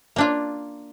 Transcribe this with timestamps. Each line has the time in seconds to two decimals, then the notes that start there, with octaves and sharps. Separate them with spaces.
0.16 A#3 D4 F4